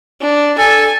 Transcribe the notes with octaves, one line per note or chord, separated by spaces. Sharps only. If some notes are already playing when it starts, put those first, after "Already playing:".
D4
A4 G#5